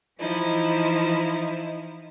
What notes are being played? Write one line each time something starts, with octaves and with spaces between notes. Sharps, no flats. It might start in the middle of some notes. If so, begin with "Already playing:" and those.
E3 F3 D#4 E4